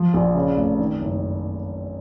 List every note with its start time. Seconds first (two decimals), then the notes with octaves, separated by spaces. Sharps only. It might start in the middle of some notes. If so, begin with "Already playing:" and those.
Already playing: F3
0.14 A#1
0.35 C#3
0.56 F1
0.80 D#3
1.01 F#1